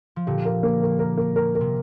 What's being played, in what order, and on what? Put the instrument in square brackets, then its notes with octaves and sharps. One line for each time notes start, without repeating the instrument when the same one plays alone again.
[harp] F3
[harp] A#2 D3 [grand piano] G4
[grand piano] A#4
A#3
A#4
A#4
A#3
A#4
A#4
[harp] C3